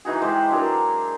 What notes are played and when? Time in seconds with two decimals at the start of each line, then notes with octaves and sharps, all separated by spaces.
0.05 E3 D#4 F#4 G#4
0.21 E3 G#3 G4 C5
0.51 F#3 D4 G#4 A#4